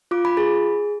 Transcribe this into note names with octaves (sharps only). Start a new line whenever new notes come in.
F4 D6
B5
G#4 B5